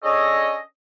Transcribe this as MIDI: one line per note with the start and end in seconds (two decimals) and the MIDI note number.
0.03 0.56 61
0.03 0.56 62
0.03 0.56 68
0.03 0.56 69
0.03 0.56 73
0.03 0.56 75